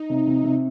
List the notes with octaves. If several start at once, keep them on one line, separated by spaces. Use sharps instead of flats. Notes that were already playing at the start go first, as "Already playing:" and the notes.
Already playing: D#4
C3
C3
C3